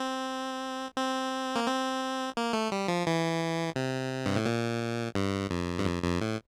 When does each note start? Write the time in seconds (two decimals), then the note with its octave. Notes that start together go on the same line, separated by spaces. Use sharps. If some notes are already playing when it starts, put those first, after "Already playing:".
Already playing: C4
0.96 C4
1.56 A#3
1.67 C4
2.37 A#3
2.53 A3
2.72 G3
2.88 F3
3.07 E3
3.76 C3
4.26 G2
4.36 A2
4.46 A#2
5.15 G2
5.50 F2
5.78 G2
5.85 F2
6.04 F2
6.21 A2